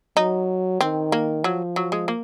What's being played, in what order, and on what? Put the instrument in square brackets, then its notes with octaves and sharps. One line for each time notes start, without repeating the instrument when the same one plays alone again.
[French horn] F#3 [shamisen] D#4
[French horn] D#3 [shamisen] C4
[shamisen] A#3
[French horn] F3 [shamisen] F#3
[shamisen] F#3
G#3
A#3